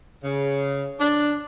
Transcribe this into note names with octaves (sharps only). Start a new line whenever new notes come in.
C#3
D4